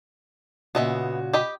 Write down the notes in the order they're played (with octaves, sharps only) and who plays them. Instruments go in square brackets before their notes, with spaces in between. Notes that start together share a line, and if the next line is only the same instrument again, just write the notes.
[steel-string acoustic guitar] A#2 C#3 F#4 [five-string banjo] B3 D#5 E5
[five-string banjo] G4 D#5 B5